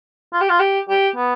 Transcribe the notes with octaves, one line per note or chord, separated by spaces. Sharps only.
F4
G4
F4
G4
G4
B3